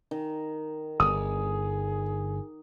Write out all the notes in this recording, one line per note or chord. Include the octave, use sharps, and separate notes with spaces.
D#3
G1 G#4 D#6